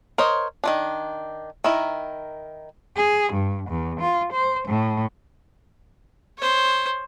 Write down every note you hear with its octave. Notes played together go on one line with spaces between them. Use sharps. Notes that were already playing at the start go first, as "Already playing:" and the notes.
A#4 C5 C#5 D#5
D#3 F3 D4
D#3 E4 A#4
G#4
G2
E2
F4
C5
A2
C5 C#5